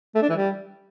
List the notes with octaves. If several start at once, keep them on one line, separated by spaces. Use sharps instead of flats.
A3
D4
E3
G3